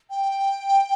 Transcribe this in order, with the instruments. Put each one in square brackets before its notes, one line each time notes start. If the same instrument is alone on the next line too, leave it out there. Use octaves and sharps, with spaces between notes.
[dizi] G5